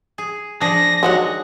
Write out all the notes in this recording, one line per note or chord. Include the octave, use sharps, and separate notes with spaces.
G#4
F3 D4 G#4 A#6
D#3 F#3 G#3 F#5